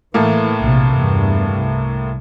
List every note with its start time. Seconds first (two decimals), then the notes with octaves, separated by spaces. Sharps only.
0.14 A2 E3 A3 A#3
0.61 A#1 C3
0.95 E2 G2
1.54 C2